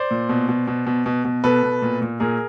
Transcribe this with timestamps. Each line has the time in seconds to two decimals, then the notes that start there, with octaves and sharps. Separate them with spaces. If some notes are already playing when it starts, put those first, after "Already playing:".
Already playing: C5 D5
0.11 A#2
0.29 B2
0.49 B2
0.67 B2
0.87 B2
1.06 B2
1.25 B2
1.44 B2 A4 B4
1.63 B2
1.82 A#2
2.02 A#2
2.20 A#2 G#4 A#4